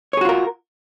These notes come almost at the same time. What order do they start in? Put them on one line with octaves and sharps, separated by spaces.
C#5 G#4 F#4 F4 A#4